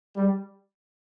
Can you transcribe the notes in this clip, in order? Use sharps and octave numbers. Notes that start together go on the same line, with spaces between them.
G3